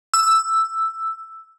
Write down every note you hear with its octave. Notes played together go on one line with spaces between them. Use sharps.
E6